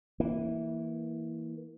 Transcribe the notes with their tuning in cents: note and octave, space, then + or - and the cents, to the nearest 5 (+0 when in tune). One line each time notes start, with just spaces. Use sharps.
E3 -10 A#3 +0